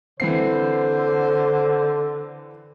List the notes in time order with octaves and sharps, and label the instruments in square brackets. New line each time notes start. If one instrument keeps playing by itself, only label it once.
[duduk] D3 [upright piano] E3 C4 C7 [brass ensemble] C5